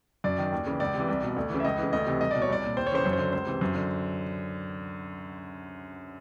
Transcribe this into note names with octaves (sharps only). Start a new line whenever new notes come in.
F#2 D5
D#3
D#2
C#3 E3
C#2 D5
C3 E3
C2
B2
D2
C#3 E3
E5
C#2 D#5
C#3 E3
D2 D#5
C3 E3
C2 D#5
B2 D5
C#5
C2 D5
A#2
D#2 C5
C#5
C#3 E3 C5
F#2 C#5
C5
D3
C#2 C5
C3 E3
F#2
D3